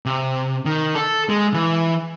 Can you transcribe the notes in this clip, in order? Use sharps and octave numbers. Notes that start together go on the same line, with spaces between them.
C3
D#3
A4
G#3
E3